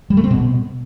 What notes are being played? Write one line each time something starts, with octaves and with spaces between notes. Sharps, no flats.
G3
A3
C4
B2